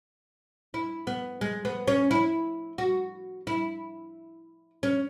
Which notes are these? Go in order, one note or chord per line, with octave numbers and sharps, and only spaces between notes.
E4
B3
G#3
B3
C#4
E4
F#4
E4
C#4